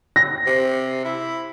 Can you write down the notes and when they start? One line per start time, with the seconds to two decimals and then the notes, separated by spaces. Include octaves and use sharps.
0.16 A#6
0.47 C3
1.05 E4